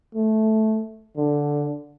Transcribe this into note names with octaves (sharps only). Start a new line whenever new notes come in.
A3
D3